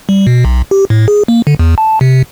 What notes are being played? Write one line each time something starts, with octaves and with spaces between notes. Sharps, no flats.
G3
B2
B1
G4
A2
G#4
A#3
D3
E2
A5
C3